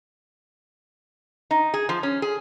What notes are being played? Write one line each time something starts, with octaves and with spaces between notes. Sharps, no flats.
D#4
G#4
F3
C#4
G#4